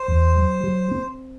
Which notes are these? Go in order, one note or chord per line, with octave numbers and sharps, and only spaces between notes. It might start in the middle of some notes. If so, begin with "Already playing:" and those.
Already playing: C5
E2
F#3
F#3
C4